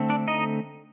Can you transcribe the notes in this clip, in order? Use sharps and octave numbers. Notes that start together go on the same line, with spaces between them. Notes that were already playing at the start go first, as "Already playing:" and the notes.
Already playing: D3 A3 C4
D4 D5
D#4 D#5